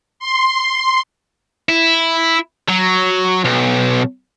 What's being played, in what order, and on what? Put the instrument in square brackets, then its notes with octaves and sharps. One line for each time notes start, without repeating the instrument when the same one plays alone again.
[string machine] C6
[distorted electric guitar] E4
F#3
B1